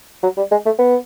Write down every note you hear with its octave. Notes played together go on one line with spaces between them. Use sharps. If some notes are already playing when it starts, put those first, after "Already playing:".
F#3
G3
G#3
A3
B3